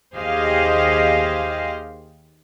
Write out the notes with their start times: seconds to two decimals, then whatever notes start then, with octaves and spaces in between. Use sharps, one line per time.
0.17 D#2 G4 G#4 C5 D#5 F5